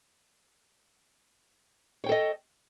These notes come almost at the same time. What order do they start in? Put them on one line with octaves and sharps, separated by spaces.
C#5 G5 A4 D#5